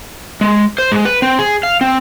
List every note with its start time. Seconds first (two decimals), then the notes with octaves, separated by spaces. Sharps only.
0.41 G#3
0.78 C5
0.92 G#3
1.05 B4
1.22 C4
1.39 G#4
1.63 F5
1.81 C4